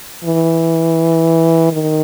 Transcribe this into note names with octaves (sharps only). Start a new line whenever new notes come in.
E3
D#3